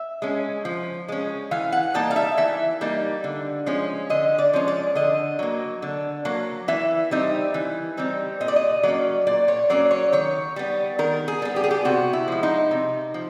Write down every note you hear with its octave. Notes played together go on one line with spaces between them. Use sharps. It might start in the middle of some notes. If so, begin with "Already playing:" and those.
Already playing: E5
G#3 C#4
F3
G#3 C#4
E3 F5
F#5
G3 A#3 D#4 A5
F5
E5
E3 E5
G3 A#3 D#4
D3
F3 G#3 C#4
D3 D#5
D5
F3 G#3 C#4 C#5
D5
D3 D#5
F#3 A#3
D3
F#3 A#3
E3 E5
G3 C4 D#4
E3
G3 C4 D#4
A#2 D#5
D5
D#5
F#3 A#3 C#4 D5
A#2 D5
C#5
F#3 A#3 C#4 D5
C#5
D#3 C#5
G3 B3
D#3 A#4
G#4
G3 B3
G4
G#4
G4
C3 F#4
E4
F3 G#3
D#4
C3
F3